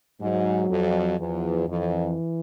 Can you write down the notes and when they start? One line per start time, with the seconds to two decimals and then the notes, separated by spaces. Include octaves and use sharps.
0.21 G#2 F#3
0.71 F2
1.19 E2 F3
1.68 F2 E3